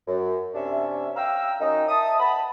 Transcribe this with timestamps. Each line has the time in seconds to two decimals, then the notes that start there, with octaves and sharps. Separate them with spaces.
0.07 F#2
0.54 C3 C#4 D4 E5
1.17 F5 G5 A#5 E6
1.61 F#2 C#4 D#4
1.89 E5 A5 D#6
2.20 F#5 A5 B5